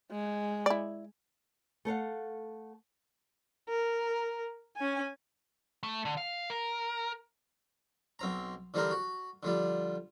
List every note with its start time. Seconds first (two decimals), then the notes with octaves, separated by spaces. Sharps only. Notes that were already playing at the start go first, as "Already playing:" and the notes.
0.12 G#3
0.66 E4 D5
1.85 A3 A4 F5 F#5
3.69 A#4
4.77 C#4 G#5
5.83 A3
6.05 D3
6.17 F5
6.50 A#4
8.19 B1 C4 A#5
8.74 D3 E3 G3 C4 A#4
8.91 F#4
9.43 D3 F3 G3